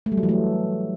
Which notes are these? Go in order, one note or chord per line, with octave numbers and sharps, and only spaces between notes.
A3
G3
F#3
E3
A3